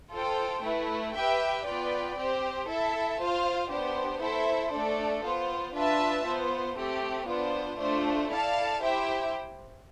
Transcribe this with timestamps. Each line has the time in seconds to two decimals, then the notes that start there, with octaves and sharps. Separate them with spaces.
0.11 F4 A4 C5 G5
0.62 A3 E4 B4
1.14 G4 B4 E5 G5
1.65 B3 F4 B4 D5 G5
2.16 C4 G4 C5
2.67 E4 A4 E5 A5
3.19 F4 C5 F5
3.70 B3 D4 G4 C5
4.21 E4 A4 C5 E5
4.72 A3 D4 A4 D5
5.23 B3 F4 C5
5.73 D4 F4 B4 E5 A5
6.25 B3 F4 C5
6.76 A3 C4 G4
7.26 B3 D4 F4 C5
7.78 A3 D4 F4 C5
8.29 E4 A4 D5 F5 A5
8.80 E4 G4 C5 E5 G5